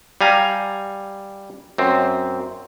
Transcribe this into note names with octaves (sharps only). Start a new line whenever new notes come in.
G3 F5 G#5 A#5
F#2 C4